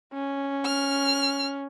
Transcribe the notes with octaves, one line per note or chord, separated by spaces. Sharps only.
C#4
F6